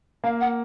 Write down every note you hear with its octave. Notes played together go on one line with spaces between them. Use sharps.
A#3 F5
F#5